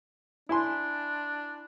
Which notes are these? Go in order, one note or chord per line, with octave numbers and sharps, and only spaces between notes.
D4 E4 G#5 C6